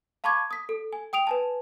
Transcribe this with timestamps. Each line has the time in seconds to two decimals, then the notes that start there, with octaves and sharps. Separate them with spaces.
0.24 F5 A5 B5 C#6 D6 G#6
0.51 D#6 B6
0.69 A4
0.93 G#5
1.13 G5 D#6 D7 F7
1.27 B4 G#5 A5